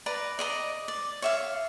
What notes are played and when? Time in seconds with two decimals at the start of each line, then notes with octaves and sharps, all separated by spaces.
0.06 B4 D5 A#5
0.39 D5 D#5 A#5
0.88 D5
1.22 C#5 E5 F5